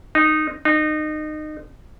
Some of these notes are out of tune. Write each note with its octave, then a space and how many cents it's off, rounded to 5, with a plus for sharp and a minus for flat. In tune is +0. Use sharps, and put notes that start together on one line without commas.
D#4 -10
D#4 -25